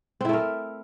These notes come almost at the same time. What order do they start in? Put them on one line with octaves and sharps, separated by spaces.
C4 E4 A3 A#4